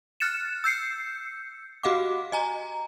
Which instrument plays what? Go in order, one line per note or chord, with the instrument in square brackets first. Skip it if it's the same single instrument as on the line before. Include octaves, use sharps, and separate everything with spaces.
[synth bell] F6 F#6 A6 C#7 E7
E6 G6 C7 C#7
F#4 G4 D#5 F5 F#5 D6
D#5 G#5 A#5